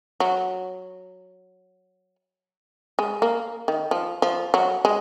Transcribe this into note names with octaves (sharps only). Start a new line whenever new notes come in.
F#3
G#3
A#3
D#3
F3
F3
F#3
G#3